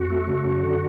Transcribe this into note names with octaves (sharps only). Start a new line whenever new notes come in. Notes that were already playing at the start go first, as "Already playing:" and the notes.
Already playing: F2 F#4
A3
C#3
F#2
D3